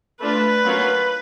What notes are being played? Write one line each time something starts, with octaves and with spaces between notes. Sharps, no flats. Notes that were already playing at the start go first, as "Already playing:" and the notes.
A3 D4 F4 B4
F#3 A#3 C#4 F4